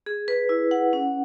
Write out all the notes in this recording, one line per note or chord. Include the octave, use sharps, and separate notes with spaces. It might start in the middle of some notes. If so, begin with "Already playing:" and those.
G#4
B4
E4
F#5
C#4